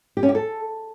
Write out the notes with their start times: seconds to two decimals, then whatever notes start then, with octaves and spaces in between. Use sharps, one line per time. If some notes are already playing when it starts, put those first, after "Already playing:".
0.17 G4
0.23 C#4
0.29 G4
0.35 A4